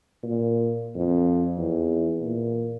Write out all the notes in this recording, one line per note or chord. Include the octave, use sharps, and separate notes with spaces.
A#2
F2
E2
A#2